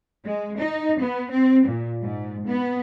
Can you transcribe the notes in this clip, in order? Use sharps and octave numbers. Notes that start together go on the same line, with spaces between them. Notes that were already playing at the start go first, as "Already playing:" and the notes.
G#3
D#4
B3
C4
A#2
G#2
B3